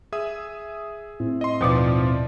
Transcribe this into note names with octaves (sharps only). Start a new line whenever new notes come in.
G#4 E5 D#6
A2 C4 E4
D#5 C6
D#2 B2 F3 F4 D5 D6